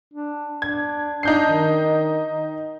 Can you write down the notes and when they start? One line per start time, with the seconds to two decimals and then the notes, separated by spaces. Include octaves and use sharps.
0.14 D4
0.62 D4 G#6
1.23 D4 D#4 G6 C7
1.49 D#3